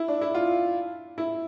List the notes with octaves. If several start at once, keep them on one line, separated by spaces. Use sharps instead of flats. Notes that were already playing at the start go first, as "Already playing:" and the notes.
Already playing: E4
D4
E4
F4
E4